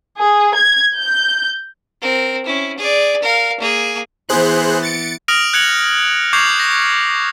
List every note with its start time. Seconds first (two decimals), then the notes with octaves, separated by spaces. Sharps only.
0.19 G#4
0.55 G#6
0.95 G6
2.02 C4 A#4
2.46 C#4 E4
2.78 G#4 D5
3.22 A#4 F5
3.61 A#3 G#4
4.29 E3 B3 G#4 C5 F#6
4.83 A6 C#7 D7
5.28 D#6 F6 A#6 D7 F7 F#7
5.53 F#6 G#6 C#7 F7 F#7
6.33 C#6 D6 G6 G#6 C7 F7
6.60 A#6